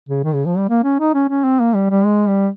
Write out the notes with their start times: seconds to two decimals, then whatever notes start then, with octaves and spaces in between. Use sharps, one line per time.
0.09 C#3
0.24 D#3
0.34 C#3
0.46 F3
0.58 G3
0.69 A#3
0.84 C#4
1.00 D#4
1.14 C#4
1.29 C#4
1.44 C4
1.60 A#3
1.75 G3
1.90 G3
2.05 G#3
2.28 G3